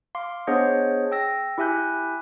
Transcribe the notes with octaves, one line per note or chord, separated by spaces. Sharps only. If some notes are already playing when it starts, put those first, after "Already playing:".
F5 C6 D6
B3 D4 G#4 C5 C#5 D#5
G5 E6 A#6
E4 G4 E5 G#5 F#6 G6